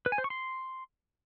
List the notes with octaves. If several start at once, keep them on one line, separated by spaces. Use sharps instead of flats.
B4
G#5
C5
C#6
C6